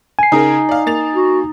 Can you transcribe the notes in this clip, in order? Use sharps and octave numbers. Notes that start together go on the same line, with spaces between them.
G#5 C7
C#3 D#4 G#4 A#4
D5 F5
A#3 A6 F7
F#4